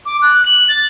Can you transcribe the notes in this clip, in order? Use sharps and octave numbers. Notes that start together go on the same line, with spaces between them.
D6
F#6
F#7
A6